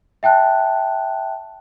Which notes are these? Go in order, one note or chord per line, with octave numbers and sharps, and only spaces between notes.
E5 G5 A5 F#6